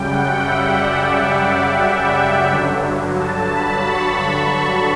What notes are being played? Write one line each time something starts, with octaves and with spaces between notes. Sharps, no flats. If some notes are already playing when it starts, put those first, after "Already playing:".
Already playing: F#2 C#3 G3 G5
F#5
E5
D5
E5
G2 D3 F#3
A5
B5
C#6